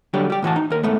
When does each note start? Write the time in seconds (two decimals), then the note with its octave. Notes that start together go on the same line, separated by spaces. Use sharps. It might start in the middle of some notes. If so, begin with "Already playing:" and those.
0.14 D3 F#3 G3 G4
0.30 G3 G4
0.42 A2 E3 F#4 A5
0.56 D#4
0.70 D#2 A#4
0.83 G#2 A3 B3